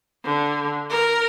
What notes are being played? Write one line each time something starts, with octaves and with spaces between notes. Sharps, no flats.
D3
A#4